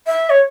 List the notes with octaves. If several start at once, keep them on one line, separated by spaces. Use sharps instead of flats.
E5
C#5